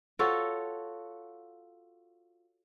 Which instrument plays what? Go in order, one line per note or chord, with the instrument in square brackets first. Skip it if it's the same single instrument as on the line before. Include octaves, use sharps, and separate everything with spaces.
[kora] F4 F#4 A4 C#5